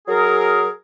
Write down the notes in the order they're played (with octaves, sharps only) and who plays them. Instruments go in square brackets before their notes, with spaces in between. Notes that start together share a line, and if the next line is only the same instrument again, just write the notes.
[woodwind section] F#3 G#4 A#4